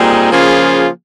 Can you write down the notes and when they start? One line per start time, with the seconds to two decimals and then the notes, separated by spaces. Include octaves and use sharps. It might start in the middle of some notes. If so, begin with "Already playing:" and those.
Already playing: A#2 G3 C4 D#4 G#4
0.29 C#3 F3 A#3 F4 G#4